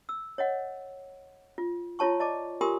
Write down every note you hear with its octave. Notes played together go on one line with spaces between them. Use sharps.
E6
C#5 D#5 F#5
F4
E4 F4 C#5 A5 C#6
D5 D#5 A5 D6
F4 G4 A#4 G#5 C6 D#6